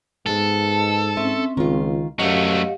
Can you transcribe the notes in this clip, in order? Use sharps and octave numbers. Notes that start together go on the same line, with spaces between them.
G#2 G#3 B3 A4
A5
C4 C#4 E5
C#2 D#3 F4
F#2 F#3 A3 G4 D#5 F5 F#5